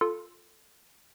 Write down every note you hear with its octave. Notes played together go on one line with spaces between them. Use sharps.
F4 A4